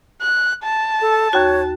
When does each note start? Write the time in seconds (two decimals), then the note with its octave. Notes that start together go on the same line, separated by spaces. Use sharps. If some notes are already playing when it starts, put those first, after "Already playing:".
0.21 F#6
0.64 A5
1.01 A4
1.33 D#2 F#4 C#5